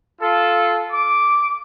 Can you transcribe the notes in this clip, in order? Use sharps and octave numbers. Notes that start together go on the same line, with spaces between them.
F4 A4
D6